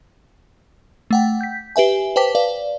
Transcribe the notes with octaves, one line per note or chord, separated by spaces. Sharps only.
A3 F#5 G5
G6 B6
G4 B4 E5 G#5
B4 C5 G5 A5 D6 B6
B4 D5 F5